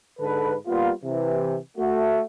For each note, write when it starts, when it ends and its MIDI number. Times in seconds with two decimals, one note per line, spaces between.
0.20 0.53 44
0.20 0.53 50
0.20 0.53 69
0.20 0.53 71
0.67 0.90 55
0.67 0.90 58
0.67 0.90 59
0.67 0.90 65
1.04 1.56 48
1.04 1.56 52
1.77 2.21 57
1.77 2.21 66